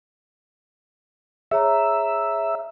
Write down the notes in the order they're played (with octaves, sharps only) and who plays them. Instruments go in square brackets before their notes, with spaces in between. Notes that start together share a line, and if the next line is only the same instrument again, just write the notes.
[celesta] G#4 C#5 A#5 [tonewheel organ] E5